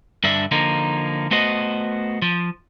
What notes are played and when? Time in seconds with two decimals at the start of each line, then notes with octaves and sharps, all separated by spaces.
0.24 G2 D3 D4 E5
0.51 D3 F3 A#3 D#4
1.31 A3 B3 F#4 C5 D#5
2.22 F3